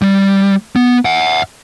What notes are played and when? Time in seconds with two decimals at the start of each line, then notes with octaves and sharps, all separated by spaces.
0.02 G3
0.76 B3
1.05 E5 F#5